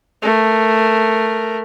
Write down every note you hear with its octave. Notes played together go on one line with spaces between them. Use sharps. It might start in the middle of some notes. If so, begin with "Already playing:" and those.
A3 A#4